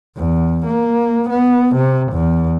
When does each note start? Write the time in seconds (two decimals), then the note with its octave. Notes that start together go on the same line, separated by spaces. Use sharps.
0.17 E2
0.66 A#3
1.29 B3
1.76 C3
2.13 E2